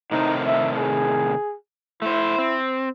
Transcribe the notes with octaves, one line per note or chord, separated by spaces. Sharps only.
A2 C3 D#3 D#4
E5
G#4
A3 E4 C5
C4